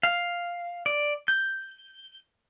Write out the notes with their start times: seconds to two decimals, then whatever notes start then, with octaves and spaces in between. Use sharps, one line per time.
0.03 F5
0.86 D5
1.28 G6